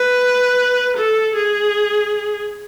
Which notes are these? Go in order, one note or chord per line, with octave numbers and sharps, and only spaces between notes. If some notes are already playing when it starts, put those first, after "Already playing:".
Already playing: B4
A4
G#4